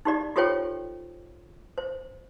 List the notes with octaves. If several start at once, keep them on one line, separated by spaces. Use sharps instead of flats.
D#4 G4 D5
F4 G4 A4 C5 C#5 G5
C5